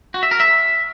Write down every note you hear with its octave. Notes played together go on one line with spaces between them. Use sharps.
F#4
E5
A#4
E5